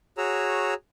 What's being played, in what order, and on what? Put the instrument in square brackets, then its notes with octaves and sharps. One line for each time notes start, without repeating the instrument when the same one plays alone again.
[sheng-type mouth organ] F#4 G#4 C#5 A#5 E6